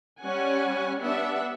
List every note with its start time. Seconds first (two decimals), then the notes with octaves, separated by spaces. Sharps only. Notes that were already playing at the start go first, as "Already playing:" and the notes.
0.20 G3 C#4 F#5 G#5
1.02 B3 D4 G4 E5 F#5